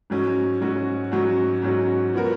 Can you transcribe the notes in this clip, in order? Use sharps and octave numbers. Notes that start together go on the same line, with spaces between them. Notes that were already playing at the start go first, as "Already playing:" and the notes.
G#2 F#3 C#4 F#4
G#2 F#3 C#4 F#4
G#2 F#3 C#4 F#4
G#2 F#3 C#4 F#4
F3 B3 F#4 A#4